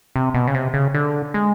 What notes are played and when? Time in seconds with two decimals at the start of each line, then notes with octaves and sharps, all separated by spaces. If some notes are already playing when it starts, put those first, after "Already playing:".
0.16 C3
0.34 B2
0.47 C#3
0.55 C3
0.74 C#3
0.95 D3
1.34 G#3